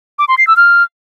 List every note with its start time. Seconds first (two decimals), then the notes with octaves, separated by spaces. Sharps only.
0.19 D6
0.28 C6
0.38 C7
0.47 E6
0.57 F6